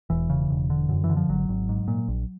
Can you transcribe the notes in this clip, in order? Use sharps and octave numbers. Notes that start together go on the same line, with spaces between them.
E1 E3
C#3
E1
D3
F#2
E3
D3
F3
G#1 F#3
G#1
G#2
A#2
A#1